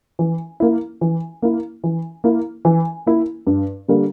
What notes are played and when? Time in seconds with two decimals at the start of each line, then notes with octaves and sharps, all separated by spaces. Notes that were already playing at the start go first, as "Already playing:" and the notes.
0.19 E3
0.60 A#3 E4
1.01 E3
1.42 A#3 E4
1.84 E3
2.24 A#3 E4
2.65 E3
3.06 A#3 E4
3.47 G2
3.88 D3 G3 A#3